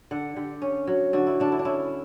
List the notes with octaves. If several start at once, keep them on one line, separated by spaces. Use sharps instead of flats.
D3 F#5
D3 G4
C#4
F#3
D3 F#4
E4
D3 D4
E4
D4
C#4 E4